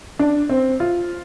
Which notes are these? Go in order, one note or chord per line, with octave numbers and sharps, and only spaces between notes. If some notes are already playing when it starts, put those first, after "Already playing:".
D4
C4
F4